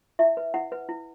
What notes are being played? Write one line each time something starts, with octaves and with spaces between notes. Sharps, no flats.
E4 E5
B4
E4 F#5
B4
E4